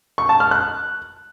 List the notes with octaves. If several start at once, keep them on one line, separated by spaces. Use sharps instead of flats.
C#6
A5
F6
F#6